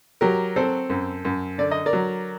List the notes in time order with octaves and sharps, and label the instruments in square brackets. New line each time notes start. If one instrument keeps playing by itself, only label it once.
[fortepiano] F#3 G4 A#4
C4 A4 C5
F#2
F#2
D3 D5
D#5
A#4 D5
F#3